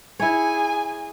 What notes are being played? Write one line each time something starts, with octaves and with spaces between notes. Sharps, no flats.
E4 G#4 C#5 G#5